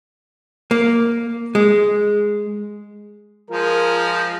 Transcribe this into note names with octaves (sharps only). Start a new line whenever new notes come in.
A#3
G#3
F3 G#3 F4 A#4